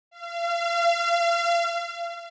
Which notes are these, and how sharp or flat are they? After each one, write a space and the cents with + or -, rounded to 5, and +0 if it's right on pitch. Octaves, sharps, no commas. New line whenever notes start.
F5 -35